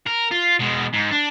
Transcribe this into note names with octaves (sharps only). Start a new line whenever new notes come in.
A#4
F4
B2 G#3
G#2
D4